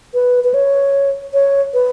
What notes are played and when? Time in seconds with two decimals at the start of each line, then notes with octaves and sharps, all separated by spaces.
0.14 B4
0.44 B4
0.54 C#5
1.34 C#5
1.74 B4